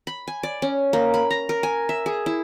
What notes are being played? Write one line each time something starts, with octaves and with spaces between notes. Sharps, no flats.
B5
G#5
D5
C#4
A#3
B5
A#5
A#4
G#5
E5
G#4
E4